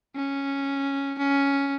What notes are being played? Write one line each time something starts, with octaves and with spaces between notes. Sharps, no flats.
C#4
C#4